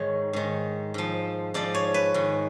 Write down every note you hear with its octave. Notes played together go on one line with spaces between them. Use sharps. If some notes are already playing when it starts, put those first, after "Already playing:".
Already playing: G#2 D#3 C#5
G#2 D#3
G#2 F3
G#2 F3 D5
C#5
B4
G#2 D#3